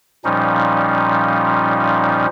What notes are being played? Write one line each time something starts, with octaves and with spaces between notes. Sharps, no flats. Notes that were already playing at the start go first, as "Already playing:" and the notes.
A#2 F3 G3 C#4 D#4